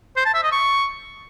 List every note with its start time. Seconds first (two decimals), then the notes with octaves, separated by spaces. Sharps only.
0.17 C5
0.26 A5
0.34 E5
0.43 D#5
0.52 C#6